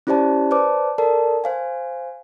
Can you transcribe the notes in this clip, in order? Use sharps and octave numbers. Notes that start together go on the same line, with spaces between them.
C#4 E4 G4 C5 D5 A5
B4 C5 D5 A5 D6
A4 A#4 D5 A5
C5 F5 G#5